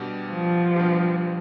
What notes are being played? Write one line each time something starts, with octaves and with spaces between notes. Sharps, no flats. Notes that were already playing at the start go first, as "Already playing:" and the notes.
Already playing: B2 G3 D4 G4
F3
B2 G3 D4 G4